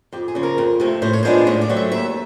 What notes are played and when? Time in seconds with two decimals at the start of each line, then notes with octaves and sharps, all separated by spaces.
0.12 F2 G4
0.28 G#4
0.35 C#3 F3
0.43 A#4
0.58 F2
0.80 C3 F3 A3
1.02 A2 C5
1.13 C#5
1.23 F3 G#3 B3 D4 C5
1.47 A2 C#5
1.61 D5
1.69 F#3 A3 C4
1.76 E5
1.92 D#2 E5